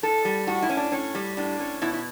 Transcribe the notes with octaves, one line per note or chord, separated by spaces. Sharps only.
A2 A4
G3
A2 F#4
E4
C#4
D4
A2 C#4
G3
A2 D4
C#4
B2 E4
E4